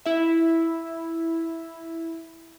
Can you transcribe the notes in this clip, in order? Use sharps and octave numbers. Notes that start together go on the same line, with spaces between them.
E4 E5